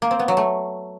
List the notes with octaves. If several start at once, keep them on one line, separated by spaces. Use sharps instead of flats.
A#3
C4
B3
F#3
A3